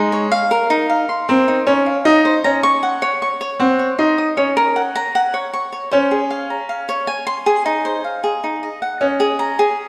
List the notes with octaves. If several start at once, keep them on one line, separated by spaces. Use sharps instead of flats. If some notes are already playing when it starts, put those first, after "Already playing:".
Already playing: G#3 D#4
C#5
F5
A#4
D#4
F5
C6
C4 A#4
D#4
C#4 C#5
F5
D#4 D#5
C5
C#4 A#5
C#6
F#5
C#5
C#6
C#5
C4 F#5
C#5
D#4 C6
D#6
C#4 C#5
A#4
F#5
A#5
F#5
C#5
C#6
C#5
C#4 C5
G#4
F5
A#5
F5
C#5
G#5
C6
G#4
D#4
C5
F5
G#4
D#4
D#5
F#5
C#4 D#5
G#4
A#5
G#4